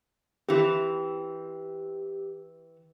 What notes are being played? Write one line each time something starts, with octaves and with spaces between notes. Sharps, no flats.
E3 C4 G4